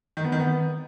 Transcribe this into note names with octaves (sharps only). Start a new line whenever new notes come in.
D#3
B3
D#3
B3